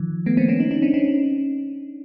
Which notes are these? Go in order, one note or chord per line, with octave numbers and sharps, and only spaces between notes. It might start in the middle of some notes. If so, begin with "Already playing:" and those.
Already playing: D#3 F3
A3 B3
A#3 C4
B3 C#4
C#4 D#4
C#4 D#4
C4 D4
C#4 D#4